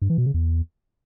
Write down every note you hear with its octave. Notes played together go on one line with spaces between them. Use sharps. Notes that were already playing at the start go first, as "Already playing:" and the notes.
G2
E3
B2
C#3
E2